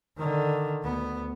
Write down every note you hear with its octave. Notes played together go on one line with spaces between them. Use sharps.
D3 D#3
D2 B3